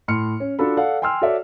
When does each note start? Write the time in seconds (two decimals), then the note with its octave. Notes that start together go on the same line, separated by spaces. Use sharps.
0.08 A2 C6 F6 C#7
0.40 C#4
0.59 D4 F4 F#4 A4 B5
0.77 A4 D5 F5 F#5
1.02 G5 G#5 C6 E6 F6
1.22 F#4 A4 C#5 D5 E5